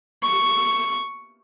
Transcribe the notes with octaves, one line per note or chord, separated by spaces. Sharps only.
C#6